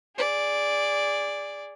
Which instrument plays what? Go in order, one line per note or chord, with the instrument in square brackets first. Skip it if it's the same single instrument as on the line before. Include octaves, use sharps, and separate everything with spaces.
[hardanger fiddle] G#4 D5